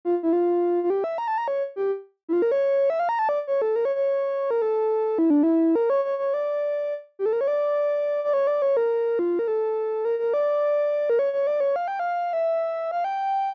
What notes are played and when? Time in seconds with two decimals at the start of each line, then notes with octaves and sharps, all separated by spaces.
0.05 F4
0.23 E4
0.33 F4
0.84 F4
0.90 G4
1.04 E5
1.18 A#5
1.28 A5
1.38 A#5
1.48 C#5
1.76 G4
2.29 E4
2.33 F4
2.42 A#4
2.52 C#5
2.90 E5
3.00 F5
3.09 A#5
3.19 A5
3.29 D5
3.47 C#5
3.62 A4
3.76 A#4
3.85 C#5
3.96 C#5
4.51 A#4
4.62 A4
5.18 E4
5.30 D4
5.43 E4
5.75 A#4
5.90 C#5
6.05 C#5
6.19 C#5
6.34 D5
7.19 G4
7.26 A4
7.33 A#4
7.41 C#5
7.48 D5
8.24 D5
8.33 C#5
8.47 D5
8.62 C#5
8.77 A#4
9.19 F4
9.39 A#4
9.48 A4
10.05 A#4
10.19 A#4
10.34 D5
11.10 A#4
11.19 C#5
11.33 C#5
11.47 D5
11.60 C#5
11.76 F5
11.88 G5
11.99 F5
12.33 E5
12.91 F5
13.04 G5